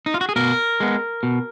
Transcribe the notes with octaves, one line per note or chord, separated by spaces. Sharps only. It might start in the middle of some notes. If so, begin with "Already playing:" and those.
D#4
F4
F#4
G#4
B2 A#4
G#3 B3
B2